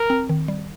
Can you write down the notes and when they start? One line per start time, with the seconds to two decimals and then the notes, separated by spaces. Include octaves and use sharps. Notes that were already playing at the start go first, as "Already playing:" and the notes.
Already playing: A#4
0.10 C4
0.29 D#3
0.48 G3